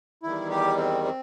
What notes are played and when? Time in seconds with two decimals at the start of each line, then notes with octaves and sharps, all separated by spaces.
0.23 E2 D#3 G3 E4
0.50 G4
0.77 C4
1.04 C4